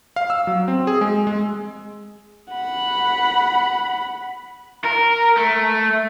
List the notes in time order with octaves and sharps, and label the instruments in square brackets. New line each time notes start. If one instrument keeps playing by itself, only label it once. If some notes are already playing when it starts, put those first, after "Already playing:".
[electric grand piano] F5
E6
F#3
C4
G#4
G#3
G#3
[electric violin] F#5 B5
[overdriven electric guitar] A#4
A3